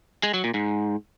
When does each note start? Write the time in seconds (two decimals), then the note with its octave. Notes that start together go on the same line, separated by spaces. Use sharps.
0.23 G#3
0.34 F#3
0.44 A#2
0.54 G#2